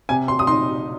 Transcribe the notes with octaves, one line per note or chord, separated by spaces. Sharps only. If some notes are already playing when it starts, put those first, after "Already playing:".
C3 G#5
C6
D#6
D#4 C6